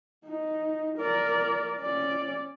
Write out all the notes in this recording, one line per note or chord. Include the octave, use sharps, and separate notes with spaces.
D#4
A#4 D5
C#4 D5